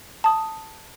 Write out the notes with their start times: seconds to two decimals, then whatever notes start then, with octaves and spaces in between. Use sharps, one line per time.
0.24 A5 D#6